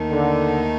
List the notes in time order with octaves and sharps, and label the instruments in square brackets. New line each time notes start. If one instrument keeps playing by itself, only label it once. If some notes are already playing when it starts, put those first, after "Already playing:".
Already playing: [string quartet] D#2 D#3 A3 D#4
[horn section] D3